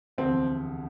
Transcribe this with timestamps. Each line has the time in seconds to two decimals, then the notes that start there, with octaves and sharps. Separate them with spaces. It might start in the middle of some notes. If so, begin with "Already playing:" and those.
0.18 E1 D2 C3 F3 C4